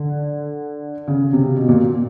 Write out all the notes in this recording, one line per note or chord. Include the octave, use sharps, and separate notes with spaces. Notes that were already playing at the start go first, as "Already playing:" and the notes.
Already playing: D3
C#3
C3
B2
A#2